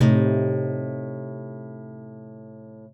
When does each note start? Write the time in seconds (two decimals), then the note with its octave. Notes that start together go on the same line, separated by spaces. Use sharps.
0.01 A2 C3 D#4